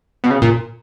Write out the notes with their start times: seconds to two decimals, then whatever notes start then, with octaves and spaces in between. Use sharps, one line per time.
0.24 B2
0.30 C#3
0.42 A#2